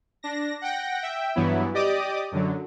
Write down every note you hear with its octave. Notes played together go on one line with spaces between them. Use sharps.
D4 A#6
F#5 G5 A#6
E5 G5
G2 E3 F#3 B3 E4
G4 D5 D#5 D6 D#6
F#2 D3 F#3